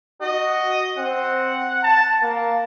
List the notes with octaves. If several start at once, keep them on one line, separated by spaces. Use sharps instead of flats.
F#4 D#5
C4 F#5
A5
A#3